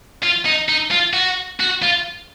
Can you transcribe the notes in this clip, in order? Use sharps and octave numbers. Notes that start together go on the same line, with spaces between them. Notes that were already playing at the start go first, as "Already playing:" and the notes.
F4
D#4
D#4
F4
F#4
F#4
F4